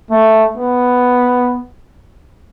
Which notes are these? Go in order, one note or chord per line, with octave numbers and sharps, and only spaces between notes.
A3
B3